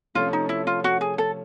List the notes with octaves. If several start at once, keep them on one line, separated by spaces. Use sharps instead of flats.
C3 F3 A3 C#4 F4
D#4
E4
F4
F#4
G#4
A4